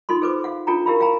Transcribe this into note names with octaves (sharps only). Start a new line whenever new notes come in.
D#4 F4 A4 C6
G#4 A4 B4 C5 D6
G#4 F5 F#5
D4 F4 A4 G5 A#5
E4 G4 A#4 F5 A#5 B5
F5 G5 G#5 A#5 B5